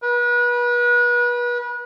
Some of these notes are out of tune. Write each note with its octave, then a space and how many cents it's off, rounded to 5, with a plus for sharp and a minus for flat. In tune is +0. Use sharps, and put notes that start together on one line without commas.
B4 -35